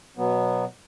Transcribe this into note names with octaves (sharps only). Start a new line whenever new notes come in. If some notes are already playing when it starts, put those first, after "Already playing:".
B2 F#3 B3